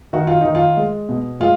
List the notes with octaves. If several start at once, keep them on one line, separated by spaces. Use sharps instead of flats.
D#3 F#4
F4
D#3 D#4
F4
G#3
B2
G#3 F4